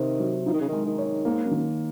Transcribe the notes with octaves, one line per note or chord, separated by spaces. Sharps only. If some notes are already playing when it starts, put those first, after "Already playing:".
Already playing: C3 D#3 C4
F#3
F3 D#4
D#3
C#3
D#3 G#3
D#3
C#5
G#2 A#3
F#2
D#3